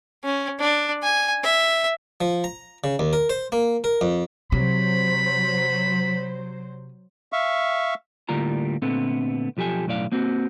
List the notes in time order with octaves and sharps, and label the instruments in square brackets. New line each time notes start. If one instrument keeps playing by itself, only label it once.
[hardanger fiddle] C#4
D4
G#5
E5
[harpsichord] F3
A#5
C#3
D#2
A#4
C5
A#3
A#4
F2
[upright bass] C3 [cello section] F#3 C5 [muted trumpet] B5
[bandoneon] E5 F5 C#6
[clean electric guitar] A2 D3 G3 A#3 F4 A#5
A#2 D3 A3 B3 C4
B1 F3 G4 A4 G#5
B1 F#2 A2 D5 F5
A#3 C4 F#4